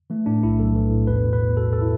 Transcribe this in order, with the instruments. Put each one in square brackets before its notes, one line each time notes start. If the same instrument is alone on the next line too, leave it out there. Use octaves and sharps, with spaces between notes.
[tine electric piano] E3 A3
A2 D4
B1 E4
B1 A4
E3
A2
E2 B4
B2
B4
E2
B2 A4
A4
E4